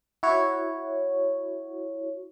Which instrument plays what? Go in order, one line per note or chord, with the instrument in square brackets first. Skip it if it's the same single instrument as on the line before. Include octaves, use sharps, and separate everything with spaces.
[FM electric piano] E4 F#4 C#5